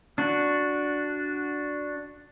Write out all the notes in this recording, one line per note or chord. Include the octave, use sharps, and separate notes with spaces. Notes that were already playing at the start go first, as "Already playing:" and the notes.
D4 F#4